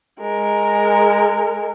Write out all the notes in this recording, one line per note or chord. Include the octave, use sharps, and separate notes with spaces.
G#3 A#4